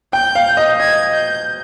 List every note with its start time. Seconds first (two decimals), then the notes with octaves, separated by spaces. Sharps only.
0.13 G5 G6
0.35 F5
0.57 D#5
0.80 D#5 G#6
1.13 G6